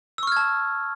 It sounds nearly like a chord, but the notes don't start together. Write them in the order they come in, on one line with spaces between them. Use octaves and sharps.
E6 C#6 F6 G#6 A5